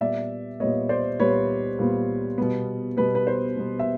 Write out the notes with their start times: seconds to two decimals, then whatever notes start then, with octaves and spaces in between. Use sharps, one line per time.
0.01 A#2 G3 B3 D5 E5
0.60 A#2 G3 B3 C#5 D#5
0.89 C5 D5
1.19 A#2 G3 B3 B4 C#5
1.79 A#2 G3 B3
2.38 B2 G3 B3
2.97 B2 G3 B3 B4
3.15 B4
3.27 C5
3.56 B2 G3 B3
3.79 E5